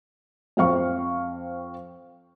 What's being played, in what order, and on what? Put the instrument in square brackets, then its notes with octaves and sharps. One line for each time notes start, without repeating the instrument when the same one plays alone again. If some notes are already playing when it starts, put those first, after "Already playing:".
[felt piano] F2 C4 F5 C#6